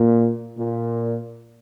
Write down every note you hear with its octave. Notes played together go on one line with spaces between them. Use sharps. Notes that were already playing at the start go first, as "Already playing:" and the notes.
Already playing: A#2
A#2